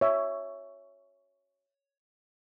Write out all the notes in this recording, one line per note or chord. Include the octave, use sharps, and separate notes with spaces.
C#5 E5